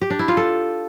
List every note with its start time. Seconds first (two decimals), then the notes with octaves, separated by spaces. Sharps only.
0.01 G4
0.10 D4
0.19 E4
0.28 F4
0.37 A4